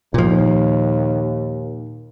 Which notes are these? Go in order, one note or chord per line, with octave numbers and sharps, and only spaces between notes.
D#2 A#2 F3